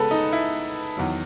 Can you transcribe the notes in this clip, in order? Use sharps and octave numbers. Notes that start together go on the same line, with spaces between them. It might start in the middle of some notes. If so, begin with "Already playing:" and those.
Already playing: C#3 G#3 B3 A4 B4
D#4
E4
E2 D#3 F#3